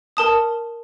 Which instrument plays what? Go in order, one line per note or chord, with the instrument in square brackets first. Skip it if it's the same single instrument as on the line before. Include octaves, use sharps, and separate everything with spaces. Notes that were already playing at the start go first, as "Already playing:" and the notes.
[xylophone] A#4 A5 D#6